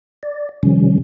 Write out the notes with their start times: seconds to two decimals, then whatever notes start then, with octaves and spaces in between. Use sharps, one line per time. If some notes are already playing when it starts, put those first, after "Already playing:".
0.23 D5
0.63 C3 D#3 F3 G3 C#4